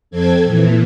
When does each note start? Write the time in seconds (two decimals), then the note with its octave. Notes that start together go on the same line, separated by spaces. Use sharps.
0.11 F2 C4 A4 G#6
0.44 A#2 E3